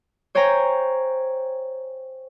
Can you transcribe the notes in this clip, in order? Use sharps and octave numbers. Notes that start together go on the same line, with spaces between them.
C5 C#5 G5 G#5 A#5